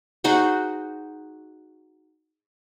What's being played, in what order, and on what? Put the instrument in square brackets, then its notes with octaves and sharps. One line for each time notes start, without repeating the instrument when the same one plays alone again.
[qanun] D#4 F#4 G#4 C5